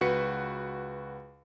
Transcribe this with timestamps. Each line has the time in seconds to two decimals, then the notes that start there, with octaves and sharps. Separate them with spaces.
0.01 C#2 F#4 B4 C#7